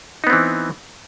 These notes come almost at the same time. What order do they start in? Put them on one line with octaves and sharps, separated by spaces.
D#4 B3 C4 E3